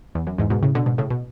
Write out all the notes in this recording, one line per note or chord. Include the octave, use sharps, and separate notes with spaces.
E2
F#2
E2 G#2
G#2 B2
A2 C#3
B2 D3
G#2 B2
A2 C#3
B2